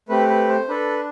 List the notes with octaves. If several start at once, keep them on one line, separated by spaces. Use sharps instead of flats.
A3 C4 G4 B4
B4
C5
D4 A4 B4